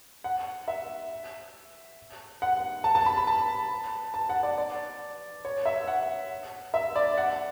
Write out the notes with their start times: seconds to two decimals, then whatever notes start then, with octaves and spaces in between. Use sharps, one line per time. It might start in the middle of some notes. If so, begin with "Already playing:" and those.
0.24 F#5
0.68 E5
2.42 F#5
2.84 A5
2.95 A5
3.06 B5
3.17 B5
3.27 A5
4.14 A5
4.29 F#5
4.43 D5
4.58 D5
5.45 C#5
5.66 E5
5.88 F#5
6.74 E5
6.96 D5
7.17 F#5